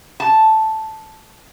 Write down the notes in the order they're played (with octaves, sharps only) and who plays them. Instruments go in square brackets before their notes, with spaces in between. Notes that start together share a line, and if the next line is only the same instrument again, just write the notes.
[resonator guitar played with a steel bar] A5